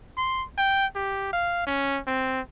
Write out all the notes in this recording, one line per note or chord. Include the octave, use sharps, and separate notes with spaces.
C6
G5
G4
F5
C#4
C4